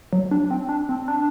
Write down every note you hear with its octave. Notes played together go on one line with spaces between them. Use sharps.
F#3
D4
C4
D4
C4
D4